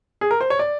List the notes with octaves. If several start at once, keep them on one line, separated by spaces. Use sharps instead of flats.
G#4
A#4
C5
C#5
D5